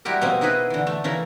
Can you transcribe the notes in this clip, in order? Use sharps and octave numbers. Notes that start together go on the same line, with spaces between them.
G3 G#3 E4 F#4 G4 A#4
B2 A#3 C4 C#4 G#5
D#4 E4 F#4 G#4 B4 D#5
D3 E3
A3
C#3 E3 E4 A#4